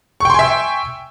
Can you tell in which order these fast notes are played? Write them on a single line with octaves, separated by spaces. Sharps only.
C#6 G5 C6 G#5 E5